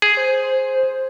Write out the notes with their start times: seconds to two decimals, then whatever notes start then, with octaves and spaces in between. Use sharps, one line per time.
0.02 G#4
0.17 C5